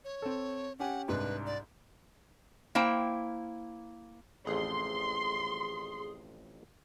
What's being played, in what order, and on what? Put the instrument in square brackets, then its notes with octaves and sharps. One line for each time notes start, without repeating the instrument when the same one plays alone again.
[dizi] C#5
[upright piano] C4 A4
[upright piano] C#4 G4 G#5 [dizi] F#5
[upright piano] C2 G#2 D4 [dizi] B4
[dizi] D5
[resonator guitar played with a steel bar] A#3 E4 C5 G5
[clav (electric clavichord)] A1 F2 [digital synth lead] G#4 [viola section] C6